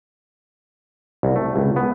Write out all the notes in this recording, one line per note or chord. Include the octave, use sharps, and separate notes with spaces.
C2
A3
C#2
B3